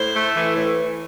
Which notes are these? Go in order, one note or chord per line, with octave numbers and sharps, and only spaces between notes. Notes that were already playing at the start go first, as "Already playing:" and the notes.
Already playing: A2 C5
A3
E3
A2